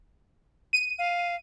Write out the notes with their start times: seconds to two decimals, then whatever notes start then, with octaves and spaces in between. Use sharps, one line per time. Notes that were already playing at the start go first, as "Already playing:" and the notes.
0.73 D#7
0.99 F5